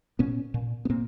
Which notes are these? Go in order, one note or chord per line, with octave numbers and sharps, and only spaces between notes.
A#2 B3 C#4
A#2
B3
A#2 A#3 C4